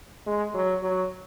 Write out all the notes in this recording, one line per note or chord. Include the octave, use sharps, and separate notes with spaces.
G#3
F#3
F#3